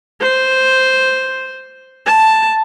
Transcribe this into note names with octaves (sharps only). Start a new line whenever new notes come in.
C5
A5